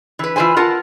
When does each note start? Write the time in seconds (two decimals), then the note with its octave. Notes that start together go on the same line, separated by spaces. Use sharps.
0.19 E3 B4
0.36 E3 F4 B4 C5 G#5
0.57 F4 A#4 F#5 A5